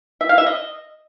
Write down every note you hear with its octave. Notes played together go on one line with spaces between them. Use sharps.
E5
F5
E5
D#5